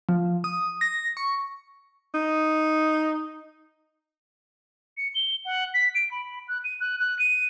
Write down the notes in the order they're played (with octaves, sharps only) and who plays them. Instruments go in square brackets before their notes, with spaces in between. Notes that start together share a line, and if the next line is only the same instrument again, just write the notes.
[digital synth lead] F3
D#6
A#6
C#6
[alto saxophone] D#4
[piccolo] C#7
G7
F#5
B6
D7
B5
F#6
D#7
F#6
F#6
D#7